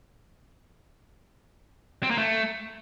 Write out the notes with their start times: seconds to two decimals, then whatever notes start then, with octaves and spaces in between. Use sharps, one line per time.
2.03 C4
2.10 A#3
2.18 A3